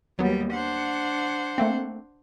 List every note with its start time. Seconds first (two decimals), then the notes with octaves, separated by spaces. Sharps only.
0.19 D#2 F#3 G3 B3
0.53 D4 C5 F#5
1.58 A3 A#3 C4